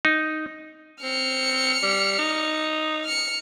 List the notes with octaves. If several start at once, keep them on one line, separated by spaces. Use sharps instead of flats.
D#4
C4 F6 C#7
G3
D#4
F6 C#7